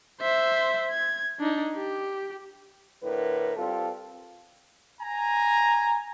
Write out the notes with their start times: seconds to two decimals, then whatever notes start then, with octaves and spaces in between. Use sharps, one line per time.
0.21 C5 E5
0.91 G#6
1.40 D4 D#4
1.75 G4
3.03 A2 D3 A#4 B4
3.56 G3 C4 F4 A4
5.01 G#5 A#5